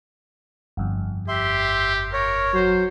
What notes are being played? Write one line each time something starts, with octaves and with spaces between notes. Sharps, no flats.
G1 F2
G4 E5 C6
A#4 C#5
F#3 C5